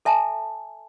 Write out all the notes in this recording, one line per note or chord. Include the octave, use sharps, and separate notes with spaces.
A4 E5 G#5 A5